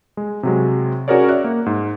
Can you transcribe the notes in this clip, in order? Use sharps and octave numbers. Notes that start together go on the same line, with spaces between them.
G#3
C3 F#3 G#3
C#4 F#4 G#4 A#4 C#5 D5
D5 E5 F#6
A#3
G#2